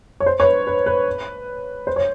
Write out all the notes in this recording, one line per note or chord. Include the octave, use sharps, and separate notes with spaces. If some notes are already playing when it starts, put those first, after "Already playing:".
C#5
C5
B4 C#5
B4
B4
C5
C#5